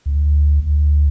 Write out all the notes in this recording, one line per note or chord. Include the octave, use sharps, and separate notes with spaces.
D2
D2